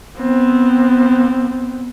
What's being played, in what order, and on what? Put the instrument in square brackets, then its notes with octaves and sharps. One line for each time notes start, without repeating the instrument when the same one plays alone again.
[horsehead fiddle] B3 C4